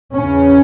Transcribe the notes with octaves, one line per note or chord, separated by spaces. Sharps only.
E2 C#3 C#4